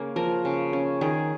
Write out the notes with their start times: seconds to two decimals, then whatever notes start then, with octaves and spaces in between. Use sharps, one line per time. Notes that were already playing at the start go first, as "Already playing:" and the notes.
Already playing: C#3 A#3 C#4
0.16 F3 A#4
0.45 C#3
0.73 C#4
1.01 D#3 G#4